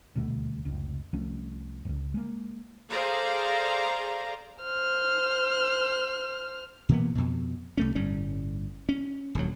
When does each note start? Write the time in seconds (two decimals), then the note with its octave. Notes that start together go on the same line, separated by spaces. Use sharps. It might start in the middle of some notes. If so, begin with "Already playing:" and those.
0.15 D#1 D2 B2 A3
0.65 F1 C#2
1.13 C2 F3 A3 C#4
1.85 D#1 C#2
2.14 G#3 A#3
2.89 G#4 A4 C5 D5 F5 A#5
4.63 C5 F6
6.89 B2 E3 A#3 B3
7.15 F2 B2
7.77 C2 A3 C#4
7.95 G1 A2 G3 C#4
8.89 C#4
9.35 D#1 D2 F#3